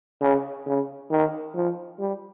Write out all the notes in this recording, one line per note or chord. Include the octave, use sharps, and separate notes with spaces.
C#3
C#3
D#3
F3
G3